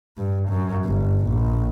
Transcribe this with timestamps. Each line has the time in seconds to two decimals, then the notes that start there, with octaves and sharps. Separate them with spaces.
0.17 G2
0.48 F#2
0.85 G1
1.26 A#1